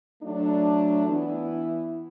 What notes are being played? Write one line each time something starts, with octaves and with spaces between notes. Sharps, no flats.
F#3 A3 D4
E3 B3 E4